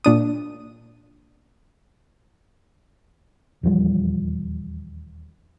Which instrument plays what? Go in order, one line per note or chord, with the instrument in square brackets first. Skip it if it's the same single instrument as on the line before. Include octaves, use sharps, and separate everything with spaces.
[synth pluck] A#2 D4 D#6
[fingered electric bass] D#1 E2 F3 G3